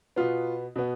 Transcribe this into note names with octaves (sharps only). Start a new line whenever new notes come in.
B2 B3 F4
B2 B3